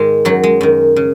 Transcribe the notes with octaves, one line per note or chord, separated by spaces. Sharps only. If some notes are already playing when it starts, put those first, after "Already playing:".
Already playing: G#2 D#3 G#3
F#2 D#3 F#3
G#3
F#2 D#3
C#3